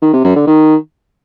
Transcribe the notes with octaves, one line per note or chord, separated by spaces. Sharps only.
D#3
C3
F#2
D3
D#3